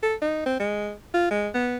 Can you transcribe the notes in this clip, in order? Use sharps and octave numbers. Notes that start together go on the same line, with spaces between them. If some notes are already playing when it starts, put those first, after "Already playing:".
A4
D#4
C4
G#3
F4
G#3
B3